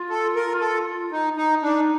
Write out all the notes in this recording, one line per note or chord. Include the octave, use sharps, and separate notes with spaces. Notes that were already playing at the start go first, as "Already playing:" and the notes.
Already playing: F4
A4
A#4
A4
D#4
D#4
D4 D#4